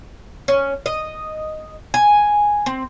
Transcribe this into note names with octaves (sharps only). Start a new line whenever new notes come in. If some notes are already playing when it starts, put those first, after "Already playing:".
C#4
D#5
G#5
C4